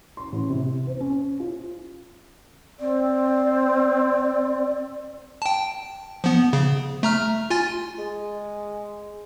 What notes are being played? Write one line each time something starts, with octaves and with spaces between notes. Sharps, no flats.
C6
A1
C3
C5
C#4
F4
C4 D5
G5 A5
F3 B3
C#3
A3 A#5 F6
F4 G#5 A6
G#3